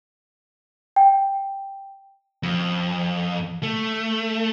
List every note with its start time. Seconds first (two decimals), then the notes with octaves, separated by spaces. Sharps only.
0.96 G5
2.43 F2
3.63 A3